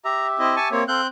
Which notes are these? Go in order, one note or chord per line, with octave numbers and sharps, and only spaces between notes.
G4 E5 A#5
C4 E4 D#5
G#5 A5 C#6
A#3 C4 C#5
C4 A4 F5 F#6 G6